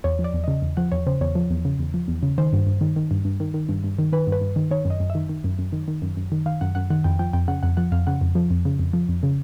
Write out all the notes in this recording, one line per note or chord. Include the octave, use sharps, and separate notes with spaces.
E2 C#5
F3
D5
E2
C#3 D#5
E2
F3 F#5
E2 C#5
C#3 C5
E2 C#5
F3
E2
C#3
E2
F3
E2
C#3
D#3 C5
G2
G2
D#3
D#3
G2
G2
D#3
D#3
G2
G2
D#3
D#3 B4
G2
B4
G2
D#3
D#3 C#5
F#2
D#5
F#2
E5
D#3
D#3
F#2
F#2
D#3
D#3
F#2
F#2
D#3
D#3 F5
F#2 F#5
F#2 F#5
D#3 F#5
F2 G5
F3 G5
F2 G5
C#3 F#5
F2 F#5
F3 F#5
F2 F5
C#3 F#5
F2
F3
F2
C#3
F2
F3
F2
C#3